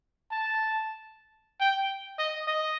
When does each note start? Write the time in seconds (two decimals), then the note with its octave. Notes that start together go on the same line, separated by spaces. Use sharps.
0.31 A5
1.61 G5
2.19 D#5
2.48 D#5